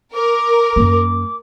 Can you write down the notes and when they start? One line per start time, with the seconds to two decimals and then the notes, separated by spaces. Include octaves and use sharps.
0.13 A#4 D6
0.76 F#2 A#3